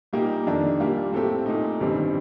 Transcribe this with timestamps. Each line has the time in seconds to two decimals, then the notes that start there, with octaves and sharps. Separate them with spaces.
0.13 A#2 G3 A#3 D#4 G4
0.47 F2 D#3 A#3 D4
0.80 A#2 G3 A#3 F4
1.12 A2 A3 C4 G4
1.46 A#2 A3 D#4
1.80 A1 G2 D#3 G3 C4